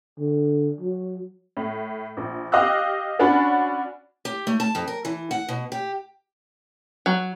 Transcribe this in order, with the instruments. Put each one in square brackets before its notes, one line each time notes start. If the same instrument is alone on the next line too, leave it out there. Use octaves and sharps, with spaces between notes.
[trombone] D3
F#3
[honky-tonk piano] A2
A#1
G4 D#5 F5 D6 E6 F#6
C#4 D4 F#4 D5 F#5 B5
[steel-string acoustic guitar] G4
A3
A5
F2
A#4
E3
F#5
B2
G4
[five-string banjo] F#3